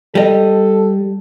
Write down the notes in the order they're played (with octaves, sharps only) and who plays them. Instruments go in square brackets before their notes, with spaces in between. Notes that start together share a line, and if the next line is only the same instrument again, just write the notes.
[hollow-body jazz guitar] G3 D#5 [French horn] A4